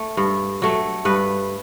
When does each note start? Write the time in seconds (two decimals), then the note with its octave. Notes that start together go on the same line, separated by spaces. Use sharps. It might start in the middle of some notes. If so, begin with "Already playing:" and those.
Already playing: A3
0.17 G2
0.62 F#3 A3
1.05 G2 B4